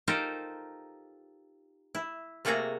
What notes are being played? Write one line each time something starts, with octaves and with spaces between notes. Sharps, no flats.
D#4 F4 G4 A4 A#4 C5
E4
C3 A3 A#3 F#4 G#4 A#5